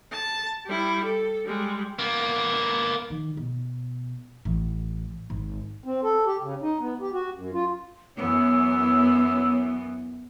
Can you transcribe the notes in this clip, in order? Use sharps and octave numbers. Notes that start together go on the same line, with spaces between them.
A5
G3 E4
A4
G3 G#3
A#3 B3
D#3
B2
A1
G#1
C4
A4
G4
C#3
D#4
B3
G4
F#4
F#2
F4
F#2 E3 B3 C#5 E6